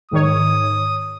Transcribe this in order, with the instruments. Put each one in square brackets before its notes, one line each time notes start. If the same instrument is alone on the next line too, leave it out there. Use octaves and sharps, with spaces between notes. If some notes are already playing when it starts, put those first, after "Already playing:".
[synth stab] G#2 D#3 C#5 [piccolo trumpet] D#6